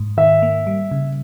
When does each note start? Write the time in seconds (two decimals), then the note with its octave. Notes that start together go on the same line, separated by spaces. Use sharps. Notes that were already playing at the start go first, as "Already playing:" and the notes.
Already playing: G#2
0.17 D#3 E5
0.42 A#3
0.67 G3
0.91 C#3